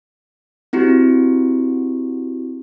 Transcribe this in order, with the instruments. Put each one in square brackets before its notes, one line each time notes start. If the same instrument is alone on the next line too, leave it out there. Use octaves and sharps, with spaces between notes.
[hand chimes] C4 E4 F#4 G4